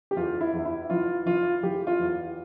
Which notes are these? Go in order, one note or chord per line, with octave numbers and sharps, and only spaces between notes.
G4
E2 F4
E4
E2
E4
E3 F4
E3 F4
E3 G4
F4
E2